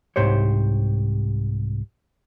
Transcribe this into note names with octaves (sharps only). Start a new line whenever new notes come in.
C2 G#2 G4 C5 C#5